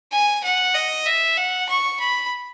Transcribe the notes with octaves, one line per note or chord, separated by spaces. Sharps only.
G#5
F#5
D#5
E5
F#5
C#6
B5